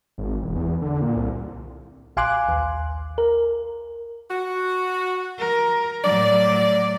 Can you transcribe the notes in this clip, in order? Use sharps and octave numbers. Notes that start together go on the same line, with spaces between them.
G#1
E1
E2
D3
A#2
C2
A#1 F5 G#5 C6 D6 F#6
D#2
A#4
F#4
A#4
A2 F#3 D5